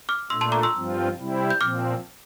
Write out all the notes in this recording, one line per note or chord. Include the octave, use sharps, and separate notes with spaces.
D6 F6
A#2 A3 D4 C6 E6
A5 C6
A#5 D6
C6 E6
G2 F3 C4 F4
C3 G3 C4 E4
G6
A#2 F3 C4 D6 F6